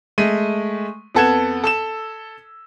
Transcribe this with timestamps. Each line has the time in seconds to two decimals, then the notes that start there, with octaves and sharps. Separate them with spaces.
0.18 G#3 A3 D#7
1.15 F2 B3 A4 F#5 G#6 E7
1.64 A4 E6 E7